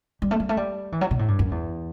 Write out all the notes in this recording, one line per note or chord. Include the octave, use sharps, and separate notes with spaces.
G3
A3
G3
A3
G3
E3
F#3
B2
A2
G2
F#2
E2